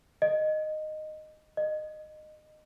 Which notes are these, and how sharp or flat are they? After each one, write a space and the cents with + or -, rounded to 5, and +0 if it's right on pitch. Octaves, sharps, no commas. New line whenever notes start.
D#5 -10
D#5 -20